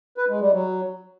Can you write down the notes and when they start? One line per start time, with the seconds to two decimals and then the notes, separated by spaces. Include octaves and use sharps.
0.17 B4
0.29 G#3
0.40 G3
0.52 F#3